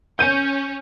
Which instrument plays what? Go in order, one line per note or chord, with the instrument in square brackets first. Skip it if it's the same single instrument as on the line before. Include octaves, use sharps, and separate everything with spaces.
[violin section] C#4 [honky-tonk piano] G6 D#7